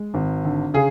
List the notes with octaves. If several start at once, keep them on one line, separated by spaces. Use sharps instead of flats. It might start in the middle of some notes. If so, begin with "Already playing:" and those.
Already playing: G#3
G#1
D3
C#3 G#4